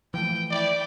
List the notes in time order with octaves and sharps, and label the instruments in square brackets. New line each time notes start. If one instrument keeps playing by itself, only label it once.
[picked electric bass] E3 F3 A3 [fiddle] G5
[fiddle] E4 G5 [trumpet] D5